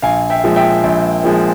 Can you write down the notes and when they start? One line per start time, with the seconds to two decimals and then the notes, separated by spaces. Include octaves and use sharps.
0.02 A#1 F5 G#5
0.30 E5 G5
0.43 A#2 F3 G#3
0.56 E5 G5
0.83 A#1
1.24 A#2 F3 G#3